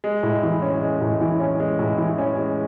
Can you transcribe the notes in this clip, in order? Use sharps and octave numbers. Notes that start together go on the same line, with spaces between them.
G#3
A2
E3
C#4
G#3
A2
E3
C#4
G#3
A2
E3
C#4
G#3